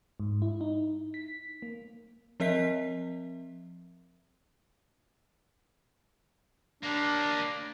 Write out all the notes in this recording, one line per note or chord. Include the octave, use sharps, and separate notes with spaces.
G#2
E4
D#4
B6
A#3
F3 C4 A#4 D#5 E5 B6
A#3 D4 G4